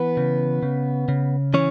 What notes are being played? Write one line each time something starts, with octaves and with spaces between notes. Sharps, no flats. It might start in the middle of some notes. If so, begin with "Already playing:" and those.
Already playing: E3 B3 B4
C#3
C#3
C#3
E3 C#4 C#5